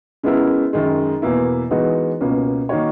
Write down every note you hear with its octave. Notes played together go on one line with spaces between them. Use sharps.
C#3 G#3 B3 E4 A#4
F#2 D#3 G#3
E2 B2 A#3 E4
E3 G#3 B3 D#4 F#4
C#2 B2 A#3 C#4
D#3 A#3 D#4 F#4 C#5